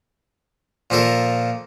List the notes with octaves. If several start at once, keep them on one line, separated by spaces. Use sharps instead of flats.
A#2 F3 A4 A#4